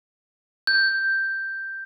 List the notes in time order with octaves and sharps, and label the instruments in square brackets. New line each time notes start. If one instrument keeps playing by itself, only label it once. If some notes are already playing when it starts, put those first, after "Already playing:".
[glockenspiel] G6